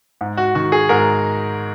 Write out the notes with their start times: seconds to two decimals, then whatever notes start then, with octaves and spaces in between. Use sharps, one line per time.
0.21 G#2
0.37 F#4
0.55 D#3 F#4
0.72 G#4
0.89 G#2 A#4